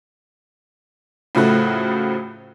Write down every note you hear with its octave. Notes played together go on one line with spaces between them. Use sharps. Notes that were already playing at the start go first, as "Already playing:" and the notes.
A2 C#3 F3 F#3 A3 F#4